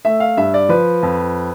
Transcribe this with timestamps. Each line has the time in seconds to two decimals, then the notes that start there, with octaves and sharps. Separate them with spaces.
0.05 A3 E5
0.20 F5
0.37 G2 E5
0.54 D5
0.69 F3 B4
1.03 F2